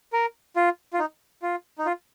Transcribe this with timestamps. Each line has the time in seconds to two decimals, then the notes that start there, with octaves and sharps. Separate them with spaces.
0.13 A#4
0.56 F4
0.93 F4
0.99 D#4
1.42 F4
1.78 D#4
1.86 F4